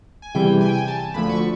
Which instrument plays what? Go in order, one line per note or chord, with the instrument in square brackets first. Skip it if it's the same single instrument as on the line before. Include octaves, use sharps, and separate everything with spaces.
[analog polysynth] G#5
E2 C3 E3 G3 G5
G#5
G5
G#5
A5
D2 D3 F3 A3 B5
C#6